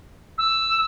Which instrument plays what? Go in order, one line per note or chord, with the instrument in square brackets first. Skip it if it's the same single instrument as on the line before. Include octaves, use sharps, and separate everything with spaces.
[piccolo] E6